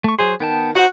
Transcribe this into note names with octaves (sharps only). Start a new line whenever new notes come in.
A3 C#6
F#3 G#4 C5 C6
D#3 B3 G5 A5
D#4 F#4 C5 F#5